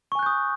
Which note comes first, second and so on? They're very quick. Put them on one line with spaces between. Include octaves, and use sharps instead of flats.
C#6 G#5 F#6 G6 D#6